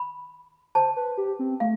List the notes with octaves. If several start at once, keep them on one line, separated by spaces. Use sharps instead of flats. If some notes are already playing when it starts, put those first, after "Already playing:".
Already playing: B5
C5 A5
B4
G4
C4
A3 F5